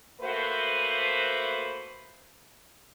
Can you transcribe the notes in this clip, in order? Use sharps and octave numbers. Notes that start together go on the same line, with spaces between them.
A3 A#3 F#4 B4 C5